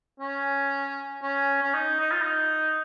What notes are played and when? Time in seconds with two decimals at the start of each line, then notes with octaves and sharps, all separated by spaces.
0.20 C#4
1.23 C#4
1.63 C#4
1.74 D#4
2.00 D#4
2.11 F4
2.22 D#4